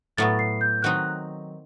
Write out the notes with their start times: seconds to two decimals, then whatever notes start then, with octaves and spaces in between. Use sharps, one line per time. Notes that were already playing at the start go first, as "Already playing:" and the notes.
0.18 A2 F#3 B3 A6
0.39 C7
0.61 G6
0.83 D#3 F#3 C4 D#4 F#6